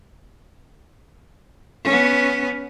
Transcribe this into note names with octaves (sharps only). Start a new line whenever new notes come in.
B3 C#4